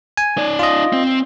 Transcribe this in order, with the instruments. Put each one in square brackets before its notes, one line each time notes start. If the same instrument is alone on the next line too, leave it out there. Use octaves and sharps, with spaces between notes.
[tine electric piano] G#5
[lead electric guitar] D#4 D5
[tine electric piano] F4 D#5
[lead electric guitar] C4